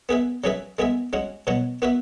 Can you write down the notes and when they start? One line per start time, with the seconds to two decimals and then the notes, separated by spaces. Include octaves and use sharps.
0.09 B3 G#4 B4 E5
0.44 F#3 C#4 G#4 B4 E5
0.79 G#3 B3 G#4 E5
1.13 G#3 C#4 F#4
1.47 B2 F#3 B3 F#4
1.82 B3 F#4 B4 E5